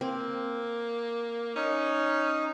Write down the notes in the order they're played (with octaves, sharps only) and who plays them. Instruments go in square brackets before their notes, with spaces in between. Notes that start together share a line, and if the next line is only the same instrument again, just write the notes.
[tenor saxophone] A#3 [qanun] C4
[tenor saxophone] C#4 [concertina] D#4